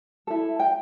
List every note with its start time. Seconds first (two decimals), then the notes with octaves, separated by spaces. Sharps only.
0.27 E4 A4
0.59 G5